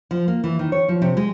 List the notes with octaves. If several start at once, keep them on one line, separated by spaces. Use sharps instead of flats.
F3
A#3
E3
D#3
C#5
F3
C3
G#3